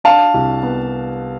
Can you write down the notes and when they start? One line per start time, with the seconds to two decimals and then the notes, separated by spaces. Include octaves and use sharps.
0.04 D4 F5 A5
0.34 C2
0.63 B3